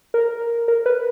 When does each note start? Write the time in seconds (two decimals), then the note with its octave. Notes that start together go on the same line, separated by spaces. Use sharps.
0.14 A#4
0.68 A#4
0.86 B4